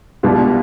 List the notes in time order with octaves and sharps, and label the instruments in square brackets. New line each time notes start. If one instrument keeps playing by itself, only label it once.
[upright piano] C2 B2 G3 D4 F4